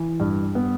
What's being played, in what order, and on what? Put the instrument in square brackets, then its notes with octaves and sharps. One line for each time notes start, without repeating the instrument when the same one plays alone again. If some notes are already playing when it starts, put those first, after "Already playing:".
Already playing: [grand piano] E3
G2
B3